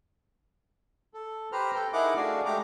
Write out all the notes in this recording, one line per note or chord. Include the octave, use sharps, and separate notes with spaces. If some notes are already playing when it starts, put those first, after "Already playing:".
A4
G4 B4 C5 A#5 F6
A4 G5
D#4 E4 G#4 A#4 F#5 D6
A3 D4 F#4 G#4 D5 F5
G#3 A3 G4 A#5 D6